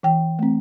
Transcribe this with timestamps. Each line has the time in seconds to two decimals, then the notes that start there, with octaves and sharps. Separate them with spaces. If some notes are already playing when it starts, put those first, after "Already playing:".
0.03 E3 G5
0.39 A3 C4